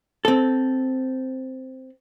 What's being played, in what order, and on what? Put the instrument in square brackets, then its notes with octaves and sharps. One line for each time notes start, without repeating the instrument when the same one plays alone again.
[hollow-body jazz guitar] C4 A4